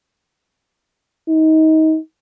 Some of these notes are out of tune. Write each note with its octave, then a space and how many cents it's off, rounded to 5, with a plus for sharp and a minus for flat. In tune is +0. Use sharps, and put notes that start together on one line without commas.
D#4 +25